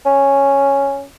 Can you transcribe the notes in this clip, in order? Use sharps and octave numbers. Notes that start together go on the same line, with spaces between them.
C#4